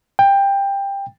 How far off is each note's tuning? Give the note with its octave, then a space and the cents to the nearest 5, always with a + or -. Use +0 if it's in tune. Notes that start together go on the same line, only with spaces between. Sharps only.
G5 +15